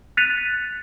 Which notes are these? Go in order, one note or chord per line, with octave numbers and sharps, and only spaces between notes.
F#6 A6 B6 C#7 D#7 F7